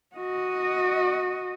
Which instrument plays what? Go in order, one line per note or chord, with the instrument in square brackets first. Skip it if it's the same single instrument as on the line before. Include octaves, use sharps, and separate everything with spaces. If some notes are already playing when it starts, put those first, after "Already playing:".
[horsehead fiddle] F#4 D#5